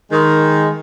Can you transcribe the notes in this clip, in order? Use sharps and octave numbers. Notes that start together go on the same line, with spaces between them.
D#3 G#3